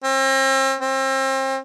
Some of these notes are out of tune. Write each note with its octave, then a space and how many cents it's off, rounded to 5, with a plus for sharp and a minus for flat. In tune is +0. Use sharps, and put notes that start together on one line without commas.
C4 +40
C4 +35